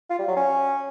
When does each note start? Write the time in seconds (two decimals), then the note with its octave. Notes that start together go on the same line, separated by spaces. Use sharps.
0.10 F4
0.19 G3
0.28 F#3
0.37 C#4